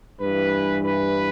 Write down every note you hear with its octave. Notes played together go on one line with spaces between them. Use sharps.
G2 E3 B4
B4